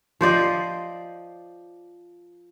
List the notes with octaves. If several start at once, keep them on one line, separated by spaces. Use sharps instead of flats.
F3 C5 D5 D#5